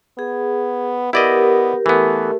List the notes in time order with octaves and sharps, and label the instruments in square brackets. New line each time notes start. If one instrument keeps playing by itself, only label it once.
[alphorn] B3 [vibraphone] G#4
[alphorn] B3 [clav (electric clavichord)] E4 D5 D#5 [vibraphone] G4 A#4
[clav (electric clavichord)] E3 B3 [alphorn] A3